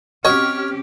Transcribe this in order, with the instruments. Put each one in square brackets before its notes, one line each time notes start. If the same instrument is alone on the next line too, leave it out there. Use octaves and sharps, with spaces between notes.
[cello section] C4 C#4 G4 [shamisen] F#4 D#5 [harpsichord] C#5 [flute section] F6